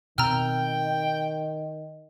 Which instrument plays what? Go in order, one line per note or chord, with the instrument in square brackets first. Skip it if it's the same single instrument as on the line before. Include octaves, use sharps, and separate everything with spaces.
[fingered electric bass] B2 C4 [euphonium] D#3 [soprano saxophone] G5 [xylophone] A#5 E6 F6